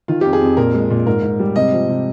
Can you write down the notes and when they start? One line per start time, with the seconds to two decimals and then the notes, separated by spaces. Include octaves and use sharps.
0.08 D#3 F4
0.21 G4
0.25 F2
0.33 G#4
0.41 F2
0.57 A#2 A#4
0.74 G#3
0.90 A#2
1.06 G#2 A#4
1.22 G#2
1.40 G3
1.56 C3 D#5
1.72 F3
1.88 C3